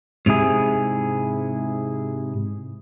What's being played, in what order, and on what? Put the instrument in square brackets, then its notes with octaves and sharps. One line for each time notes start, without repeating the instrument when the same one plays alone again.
[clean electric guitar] G#2 C3 E4 G#4